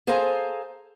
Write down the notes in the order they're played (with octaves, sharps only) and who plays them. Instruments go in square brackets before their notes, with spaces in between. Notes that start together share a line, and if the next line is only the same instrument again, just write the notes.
[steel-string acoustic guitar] G#4 A4 C5 F5 G#5 A#5